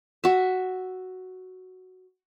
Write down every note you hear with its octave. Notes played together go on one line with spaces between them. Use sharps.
F#4 E5